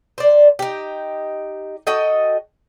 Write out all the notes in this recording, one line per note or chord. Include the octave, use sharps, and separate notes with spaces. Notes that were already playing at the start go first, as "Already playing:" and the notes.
C5 D5
D#4 G4
F#4 A4 D#5 G5